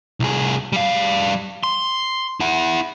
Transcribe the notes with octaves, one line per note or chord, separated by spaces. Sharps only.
C2 G#4
G3 F5
C6
E4 F#5